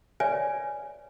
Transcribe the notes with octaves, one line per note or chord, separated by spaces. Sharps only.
B4 C#5 D5 E5 G#5